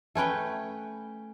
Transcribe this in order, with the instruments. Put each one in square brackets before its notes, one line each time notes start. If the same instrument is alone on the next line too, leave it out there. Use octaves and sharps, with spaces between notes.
[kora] A3 C#4 B4 G5